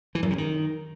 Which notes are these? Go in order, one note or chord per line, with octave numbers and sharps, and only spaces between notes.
E3
F#2
C3
D#3